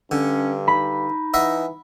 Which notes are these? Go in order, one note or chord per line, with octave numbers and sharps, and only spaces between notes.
G2 D3 C#4
D#4 B5
E3 D#5 E5 F#5